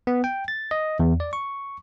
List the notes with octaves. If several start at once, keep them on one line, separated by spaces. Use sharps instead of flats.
B3
G5
A6
D#5
E2
D5
C#6